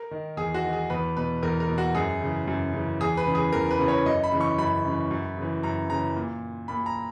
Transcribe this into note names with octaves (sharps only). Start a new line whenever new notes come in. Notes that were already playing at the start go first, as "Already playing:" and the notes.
Already playing: A#4
D#3
E2 G#4
F#4
D#3
G#4
E2 B4
B2 B4
E2 A#4
A#4
B2
F#4
F#2 G#4
C#3 E3
F#2
C#3 E3
E2 G#4
B4
C#3 E3
G#4
E2 A#4
B4
C#3 E3
C#5
F#2 D#5
B5
C#3 E3
C#6
F#2 B5
C#3 E3
F#2
C#3 E3
F#2 A#5
C#3 E3 A#5
A#2
A#2 B5
A#5